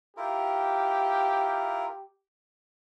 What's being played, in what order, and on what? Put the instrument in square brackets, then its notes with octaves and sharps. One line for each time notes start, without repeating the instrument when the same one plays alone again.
[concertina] E4 F4 A#4 [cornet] G4